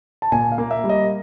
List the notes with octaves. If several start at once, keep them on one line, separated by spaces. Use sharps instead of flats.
A5
A#2 G#5
F5
A#3
E5
G3
D#5